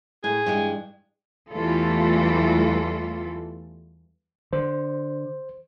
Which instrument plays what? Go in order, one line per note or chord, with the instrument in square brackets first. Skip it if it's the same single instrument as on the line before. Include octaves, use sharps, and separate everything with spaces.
[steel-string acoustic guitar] A2 [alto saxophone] G#4
[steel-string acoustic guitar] G2 E3 G#3
[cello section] E2 E3 G3 A3 F4 A4
[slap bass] D3 [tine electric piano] C5